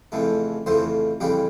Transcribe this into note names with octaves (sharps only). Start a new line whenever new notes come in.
F2 C#3 E3 A3
F2 C#3 E3 A3 C5
F2 C#3 E3 G3 G4